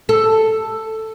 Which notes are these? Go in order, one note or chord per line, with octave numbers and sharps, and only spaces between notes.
A4